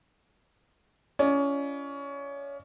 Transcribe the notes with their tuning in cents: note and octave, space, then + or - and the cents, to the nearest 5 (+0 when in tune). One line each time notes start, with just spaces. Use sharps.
C#4 +20 F4 -45 D5 +35